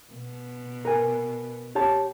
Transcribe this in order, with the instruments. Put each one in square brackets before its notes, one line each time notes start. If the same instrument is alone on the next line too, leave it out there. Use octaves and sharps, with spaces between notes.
[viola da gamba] B2
[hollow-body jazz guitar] A#4 B4 G#5
G4 C#5 A5